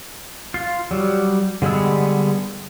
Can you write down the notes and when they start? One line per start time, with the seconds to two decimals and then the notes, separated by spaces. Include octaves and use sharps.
0.54 F4 F5
0.91 F#3 G3
1.62 D3 G3 G#3 B3 E6